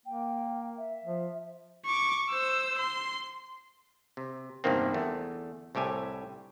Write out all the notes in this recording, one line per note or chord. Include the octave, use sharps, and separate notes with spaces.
A#3 G5
E5
F3
C#6 D6
C5 E6
C6
C3
E2 G2 C3 D#3 A#3 C4
E2 A3
C2 A2 G4 E5 G#5